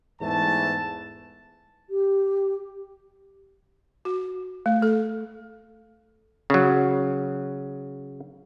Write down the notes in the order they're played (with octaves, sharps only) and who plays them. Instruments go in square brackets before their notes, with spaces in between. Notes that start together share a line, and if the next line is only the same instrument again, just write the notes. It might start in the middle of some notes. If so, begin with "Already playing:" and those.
[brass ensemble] E2 G#2 E3 A3 A5
[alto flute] G4
[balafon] F#4
A3
A4
[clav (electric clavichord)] C#3 F#3